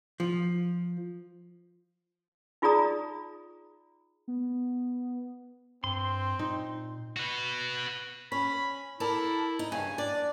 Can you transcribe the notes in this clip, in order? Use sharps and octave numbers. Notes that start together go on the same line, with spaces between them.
F3
D#4 F4 G#4 D5 A#5 D#6
B3
G2 C4 C6
A#2 D#4
F#4 B4
C#4 B5
E4 A4 A#4 D5
D#4
G2 C#3 G#5
D4 D5